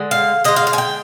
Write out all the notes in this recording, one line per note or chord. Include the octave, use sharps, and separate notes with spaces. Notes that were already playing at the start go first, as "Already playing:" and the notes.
Already playing: D3 G#3
F5
D3 G#3 D#5
F5
F5
G#5
G5